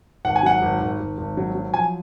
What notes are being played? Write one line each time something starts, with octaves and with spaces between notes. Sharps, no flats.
G#1 F#5
G#5
F#3 F#5
G#1
G#1
G#1
G#1
F#3
F#3
F3 G#5